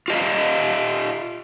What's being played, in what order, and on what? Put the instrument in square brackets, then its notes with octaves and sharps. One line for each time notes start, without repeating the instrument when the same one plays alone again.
[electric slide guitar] F4 G4 D#5 F5